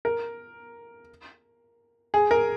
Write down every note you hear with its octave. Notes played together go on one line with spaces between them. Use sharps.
A#4
G#4
A#4